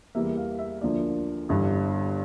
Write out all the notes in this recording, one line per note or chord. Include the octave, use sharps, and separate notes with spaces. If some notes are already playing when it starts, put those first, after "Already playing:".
E2 E3 G3 A#3 E5
F5
E5
D2 D3 F3 A#3 D5
G1 G2 E3